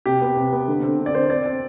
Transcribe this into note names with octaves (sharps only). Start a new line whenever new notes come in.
C3 G4
B3
C3
B3
D3
C4
D3
D5
C4 C5
C4 D5
C4